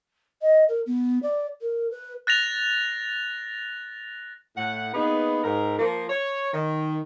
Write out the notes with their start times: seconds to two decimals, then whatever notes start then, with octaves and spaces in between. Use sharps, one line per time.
0.42 D#5
0.69 A#4
0.86 B3
1.23 D5
1.61 A#4
1.91 B4
2.27 F#6 A6 A#6 F7
4.57 A2 F#5
4.93 A#3 B3 D#4 G#4 B4
5.44 G#2 A#4
5.78 F3 A#3
6.10 C#5
6.53 D#3